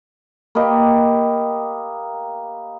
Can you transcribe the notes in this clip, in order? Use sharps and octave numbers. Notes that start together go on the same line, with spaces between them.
A#3 G4 B4 D#5